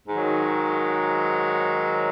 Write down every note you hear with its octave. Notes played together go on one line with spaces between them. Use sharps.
G#2 D#3 F#3